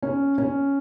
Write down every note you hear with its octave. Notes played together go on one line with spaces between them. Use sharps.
C#4
C#4